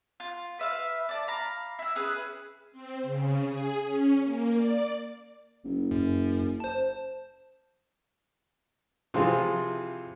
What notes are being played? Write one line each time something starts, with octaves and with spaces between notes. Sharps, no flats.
F4
B4 E5 F5
D5 A5
F5 A#5 B5
E4 E6
C#4 G#4 B4
C4
C#3
G#4
C#4
A#3
D5
F#1
F#2
C5 A5
C3 E3 F3 C4 F4 G#4